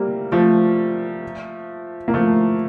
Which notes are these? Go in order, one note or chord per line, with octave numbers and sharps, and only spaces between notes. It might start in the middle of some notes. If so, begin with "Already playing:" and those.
Already playing: G3 A3 A#3 C4
F3 A3
A#3
F3 A3